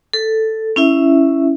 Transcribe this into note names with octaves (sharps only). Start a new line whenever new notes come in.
A4
C#4 E4 E5